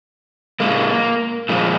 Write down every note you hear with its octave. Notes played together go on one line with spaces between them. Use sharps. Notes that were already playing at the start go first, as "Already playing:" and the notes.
A#2 G#3 A#3
A#2 F3 G#3